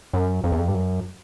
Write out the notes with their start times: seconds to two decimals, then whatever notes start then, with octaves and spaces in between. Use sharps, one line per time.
0.13 F#2
0.44 F2
0.52 E2
0.59 F2
0.68 G2
0.75 F#2